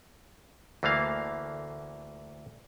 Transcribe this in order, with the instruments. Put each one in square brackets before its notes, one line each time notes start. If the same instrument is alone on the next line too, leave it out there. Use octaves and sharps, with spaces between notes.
[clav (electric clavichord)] D2 E3 A3 A#3 F5